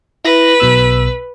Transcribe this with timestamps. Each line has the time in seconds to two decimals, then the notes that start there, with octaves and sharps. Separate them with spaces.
0.25 E4 B4 A#6
0.60 B1 B2 E6